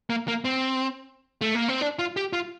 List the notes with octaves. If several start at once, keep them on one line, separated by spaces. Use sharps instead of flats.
A#3
A#3
C4
A3
A#3
C4
D4
F4
G4
F4